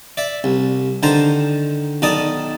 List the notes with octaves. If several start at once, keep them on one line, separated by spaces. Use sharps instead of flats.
D5 E5
C2
D3 D#3 C5 A5 A#5
B1 D#3 D#4 D5 A5 D#6